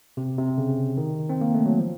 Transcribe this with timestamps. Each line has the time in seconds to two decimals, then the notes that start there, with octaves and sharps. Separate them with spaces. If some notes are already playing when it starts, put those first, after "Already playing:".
0.17 C3
0.38 C3
0.58 C#3
0.97 D#3
1.29 C4
1.41 A#3
1.54 A3
1.66 F#3
1.78 F3